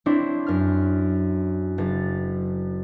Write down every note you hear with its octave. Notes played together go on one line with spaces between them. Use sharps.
C4 D4 E4 C#5
F#2 F6
F#1 A6